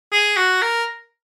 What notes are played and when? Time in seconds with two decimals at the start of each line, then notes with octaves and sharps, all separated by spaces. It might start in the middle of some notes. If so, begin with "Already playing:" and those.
0.12 G#4
0.37 F#4
0.62 A#4